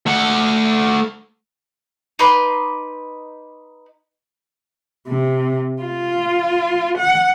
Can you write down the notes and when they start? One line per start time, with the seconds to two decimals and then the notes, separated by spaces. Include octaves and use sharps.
0.06 A3 F#5
2.19 D#4 B4 C6 D6
5.08 C3
5.82 F4
6.98 F#5